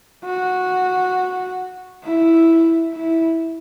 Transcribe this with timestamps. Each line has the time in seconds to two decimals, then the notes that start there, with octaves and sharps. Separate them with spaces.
0.25 F#4
2.04 E4
2.93 E4